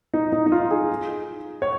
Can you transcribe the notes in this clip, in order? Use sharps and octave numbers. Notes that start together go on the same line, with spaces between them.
D#4
D#4
D#4
F4
G#4
C#5